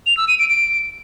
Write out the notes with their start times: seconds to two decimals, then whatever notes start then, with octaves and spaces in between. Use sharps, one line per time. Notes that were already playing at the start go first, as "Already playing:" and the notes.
0.06 F7
0.17 E6
0.28 D#7
0.39 D7
0.50 D7